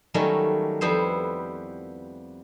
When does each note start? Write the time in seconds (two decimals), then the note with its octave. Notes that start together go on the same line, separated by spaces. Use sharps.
0.14 D#3 F#3 G3 A3 C#4
0.81 F2 G3 B3 E4 C5